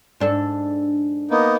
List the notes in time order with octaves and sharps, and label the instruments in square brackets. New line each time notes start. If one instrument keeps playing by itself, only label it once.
[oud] G#2 D4 A4
[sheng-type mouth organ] A#3 B3 D#4